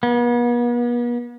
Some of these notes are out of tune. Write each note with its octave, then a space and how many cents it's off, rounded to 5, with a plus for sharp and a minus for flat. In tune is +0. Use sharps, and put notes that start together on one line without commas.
B3 -40